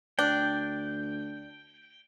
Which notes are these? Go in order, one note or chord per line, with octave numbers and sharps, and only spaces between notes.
D2 D4 G5